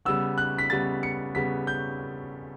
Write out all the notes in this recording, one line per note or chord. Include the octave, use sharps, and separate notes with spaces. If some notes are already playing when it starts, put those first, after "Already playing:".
C#3 G3 B3 E6
F#6
B6
C#3 G3 B3 A6
C#7
C#3 G3 B3 B6
G6